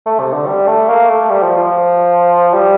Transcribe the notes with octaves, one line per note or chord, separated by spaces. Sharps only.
A3
C3
D3
G3
A3
A#3
A3
G3
F3
F3
G3